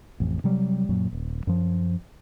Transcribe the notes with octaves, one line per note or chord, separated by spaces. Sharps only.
A1 F2
C3 F#3 G3
F#2 A#2 F#3
D#1
F#2 F3